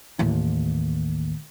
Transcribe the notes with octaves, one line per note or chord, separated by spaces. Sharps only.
A1 D#2